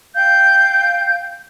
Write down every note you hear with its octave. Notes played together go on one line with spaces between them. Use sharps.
F5 G5 G6